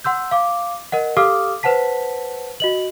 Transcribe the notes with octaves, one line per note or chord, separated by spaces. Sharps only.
F#5 C6 E6 G6
F5 D6
A#4 D#5 F#5
G4 A4 F5 D6 D#6 F6
B4 C5 F#5 A5 B6
F#4 D#5 F#7